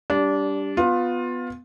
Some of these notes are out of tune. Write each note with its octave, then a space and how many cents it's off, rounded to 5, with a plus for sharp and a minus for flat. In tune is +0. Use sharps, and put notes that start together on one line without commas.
G3 +0 D4 -20
B3 +10 F4 +20